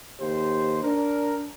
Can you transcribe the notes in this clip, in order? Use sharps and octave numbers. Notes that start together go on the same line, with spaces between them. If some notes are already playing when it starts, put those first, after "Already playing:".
D#2 G4 C5
D4 A#4